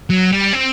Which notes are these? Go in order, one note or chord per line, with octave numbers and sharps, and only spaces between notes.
F#3
G3
C4